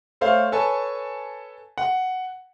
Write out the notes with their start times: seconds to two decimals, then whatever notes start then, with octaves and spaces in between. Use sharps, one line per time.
0.21 A3 A4 C5 C#5 F5
0.52 A4 B4 C#5 G#5 A5
1.78 F#5